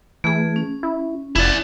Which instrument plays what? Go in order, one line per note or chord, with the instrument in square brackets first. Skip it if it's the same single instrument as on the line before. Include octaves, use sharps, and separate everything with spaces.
[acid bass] E3 [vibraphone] A3 G#4
[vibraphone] C#4
[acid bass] E4
[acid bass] F1 [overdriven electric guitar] E4 D5